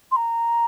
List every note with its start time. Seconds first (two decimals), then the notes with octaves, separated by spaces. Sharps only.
0.11 C6
0.16 A#5